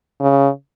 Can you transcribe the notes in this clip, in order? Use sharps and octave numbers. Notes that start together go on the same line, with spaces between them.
C#3